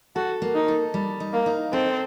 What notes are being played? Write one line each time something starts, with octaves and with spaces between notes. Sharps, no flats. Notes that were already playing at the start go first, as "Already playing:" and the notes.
F#4 A4
A#3
D#4
A4
G3
D#4
A#3
D#4
C4 A4